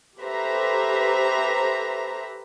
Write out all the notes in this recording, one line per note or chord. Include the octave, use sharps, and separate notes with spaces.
G4 A4 B4 C5 E5 A#5